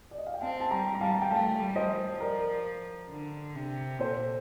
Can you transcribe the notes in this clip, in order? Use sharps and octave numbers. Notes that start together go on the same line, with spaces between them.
D5
D#5
F5
G5
C4 F5 A5
A5
G3 G5 A#5
A#5
G3 F5 A5
G5
A3 F5 A5
G3
C5 D#5
F3
A#4 D5
D3
C3
A#2 A4 C5